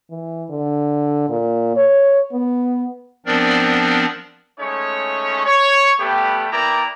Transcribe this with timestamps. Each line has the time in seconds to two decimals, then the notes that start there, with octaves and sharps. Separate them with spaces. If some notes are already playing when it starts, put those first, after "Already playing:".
0.10 E3
0.50 D3
1.29 A#2
1.76 C#5
2.32 B3
3.26 F3 B3 C4 D4 A#4 D5
4.59 G#3 A3 C#4 D#4 C#5
5.45 C#5
6.00 G3 A3 B3 G4
6.52 B3 E4 A#4 D5 G5 A#5